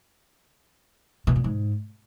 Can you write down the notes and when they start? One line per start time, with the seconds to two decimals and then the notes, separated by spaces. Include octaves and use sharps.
1.27 B2
1.36 A#2
1.44 G#2